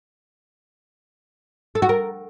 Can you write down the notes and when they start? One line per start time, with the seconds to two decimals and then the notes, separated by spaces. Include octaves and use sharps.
1.75 A4
1.82 F#4
1.89 A#4